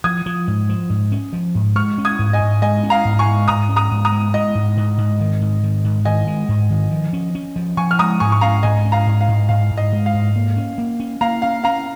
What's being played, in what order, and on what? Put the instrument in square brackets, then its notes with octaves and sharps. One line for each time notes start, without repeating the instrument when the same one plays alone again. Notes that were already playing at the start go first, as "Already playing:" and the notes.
[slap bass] F3 [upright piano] D#6 G#6
[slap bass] F3
G#2
F3
G#2
C#4
F3
G#2
[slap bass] G#3 [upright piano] C#6 F6
[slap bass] C#4
[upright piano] D#6 G#6
[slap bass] G#2
[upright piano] D#5 G#5
[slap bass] G#2
[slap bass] G#3 [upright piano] D#5 G#5
[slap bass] C#4
[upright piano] F5 A#5
[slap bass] G#2
[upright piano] G#5 C#6
[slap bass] G#3
[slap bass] G#2 [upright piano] A#5 D#6
[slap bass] C#4
[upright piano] A#5 D#6
[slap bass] G#2
[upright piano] A#5 D#6
[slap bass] G#3
[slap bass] G#3 [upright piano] D#5
[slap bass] G#2
G#2
G#2
D#3
G#2
D#3
G#2
[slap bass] D#3 [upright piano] D#5 G#5
[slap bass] G#3
G#2
D#3
F3
C#4
C#4
F3
[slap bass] F3 [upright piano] G#5 C#6
[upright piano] F6
[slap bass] G#3 [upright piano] A#5 D#6
[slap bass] G#2 [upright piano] G#5 C#6
[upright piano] C#6
[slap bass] C#4 [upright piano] F5 A#5
[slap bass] G#2 [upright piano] D#5 G#5
[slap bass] C#4
[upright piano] F5 A#5
[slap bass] G#2
[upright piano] F5
[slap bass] G#2
[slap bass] G#2 [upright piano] F5
[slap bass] G#2
[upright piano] D#5
[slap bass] G#3
[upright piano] F5
[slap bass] G#2
A#3
C#4
A#3
C#4
[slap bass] A#3 [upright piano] F5 A#5
[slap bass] C#4 [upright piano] F5
[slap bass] C#4 [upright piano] F5 A#5